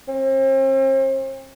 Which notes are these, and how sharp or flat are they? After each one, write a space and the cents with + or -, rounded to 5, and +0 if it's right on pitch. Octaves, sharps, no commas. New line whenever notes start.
C4 +40